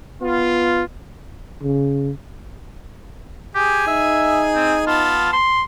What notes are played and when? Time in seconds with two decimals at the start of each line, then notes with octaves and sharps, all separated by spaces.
0.21 B3 F4
1.62 C#3
3.55 G4 G#4 G#5
3.88 D#4 E5
4.55 C4
4.87 B3 F4 A5
5.33 C6